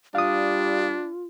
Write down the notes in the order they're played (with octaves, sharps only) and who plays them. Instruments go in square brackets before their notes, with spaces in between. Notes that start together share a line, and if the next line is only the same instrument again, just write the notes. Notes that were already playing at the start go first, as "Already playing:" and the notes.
[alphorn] G3 [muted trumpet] D4 [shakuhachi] F4 [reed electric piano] F5 D#6